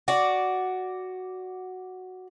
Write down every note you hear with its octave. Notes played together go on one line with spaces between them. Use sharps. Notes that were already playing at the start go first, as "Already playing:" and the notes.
F#4 D5